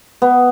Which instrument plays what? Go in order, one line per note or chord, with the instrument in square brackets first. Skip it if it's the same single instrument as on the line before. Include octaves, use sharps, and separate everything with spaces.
[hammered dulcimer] B3